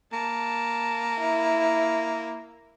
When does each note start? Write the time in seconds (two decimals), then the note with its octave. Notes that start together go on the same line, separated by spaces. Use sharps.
0.13 A#3 A5
1.21 E4